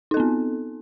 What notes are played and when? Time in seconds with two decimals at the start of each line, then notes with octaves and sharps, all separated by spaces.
0.11 D#4
0.14 A4
0.17 C4
0.20 B3